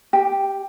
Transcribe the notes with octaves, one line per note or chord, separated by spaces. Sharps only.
G4